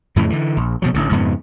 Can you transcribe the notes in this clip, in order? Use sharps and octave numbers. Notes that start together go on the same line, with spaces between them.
F2 A2 C#3 E3
D3 E3
A#1
B2 F3 F#3
A1 D3
F2 G#2 C#3 B3